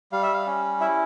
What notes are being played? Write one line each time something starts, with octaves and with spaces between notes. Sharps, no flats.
G3 F5
E5
F5
C#4
E4 E5